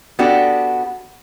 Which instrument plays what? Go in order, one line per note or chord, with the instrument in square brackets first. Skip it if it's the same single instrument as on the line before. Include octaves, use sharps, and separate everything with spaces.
[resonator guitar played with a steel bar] B3 D4 F#4 G4 A4